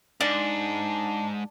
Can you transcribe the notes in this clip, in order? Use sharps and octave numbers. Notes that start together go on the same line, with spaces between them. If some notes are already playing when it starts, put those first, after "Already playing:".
G#2 D4